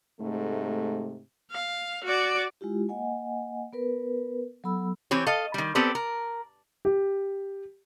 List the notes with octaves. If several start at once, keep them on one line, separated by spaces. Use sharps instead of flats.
G#2 C3 A3
F5
F#4 D5
G#3 E4 F4 G4
A#3 D#5 F#5 G#5
B3 A#4 B4
F#3 B3 A4 B5 E6
E3 C4 G4 C#5
A4 D#5 F5
D#3 G3
B3 C4 G4 A4 D5
A#4
G4